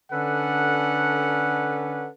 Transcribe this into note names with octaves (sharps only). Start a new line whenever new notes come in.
D3 C#4 A4 B4 D5 F#5